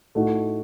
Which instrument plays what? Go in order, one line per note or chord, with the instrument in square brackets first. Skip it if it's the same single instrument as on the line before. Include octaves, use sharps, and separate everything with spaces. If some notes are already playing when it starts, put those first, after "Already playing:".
[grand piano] A2 A3 D#4 F#4